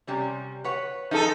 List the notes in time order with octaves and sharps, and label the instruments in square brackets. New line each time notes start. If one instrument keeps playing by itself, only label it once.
[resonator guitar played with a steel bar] C3 G3 C#4
B4 C#5 F#5
[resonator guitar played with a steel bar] F3 F4 G#4 [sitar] D#4 A4